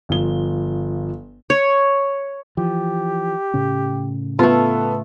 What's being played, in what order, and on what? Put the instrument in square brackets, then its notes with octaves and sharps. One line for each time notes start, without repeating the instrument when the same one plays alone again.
[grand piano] G1 F3 G7
[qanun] C#5
[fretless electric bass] E3 F3 [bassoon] G4
[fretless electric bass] A2 C#3 C#4
[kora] A3 F4 [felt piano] B3 [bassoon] A4